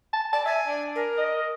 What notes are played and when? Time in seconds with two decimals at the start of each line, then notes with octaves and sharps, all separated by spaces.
0.13 A5
0.33 D5 A5
0.46 E5 G#5
0.67 D4
0.95 A#4
1.17 D#5